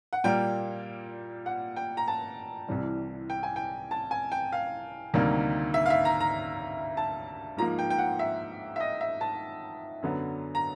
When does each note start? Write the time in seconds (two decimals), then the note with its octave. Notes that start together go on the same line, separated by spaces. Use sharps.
0.13 F#5
0.24 A#2 G3 A#3 G5
1.46 F#5
1.76 G5
1.97 A#5
2.08 A5
2.68 C2 C3 E3 G3
3.30 G5
3.43 G#5
3.56 G5
3.91 A5
4.11 G#5
4.32 G5
4.52 F5
5.13 D2 C3 D#3 G3 A#3
5.74 E5
5.86 F5
5.90 E5
6.05 A#5
6.21 A#5
6.97 A5
7.57 G#2 F3 A#3 A#5
7.79 G5
7.90 G5
7.98 F#5
8.19 E5
8.76 E5
8.80 D#5
9.01 E5
9.21 A5
10.02 F#2 D3 F#3 B3
10.55 A#5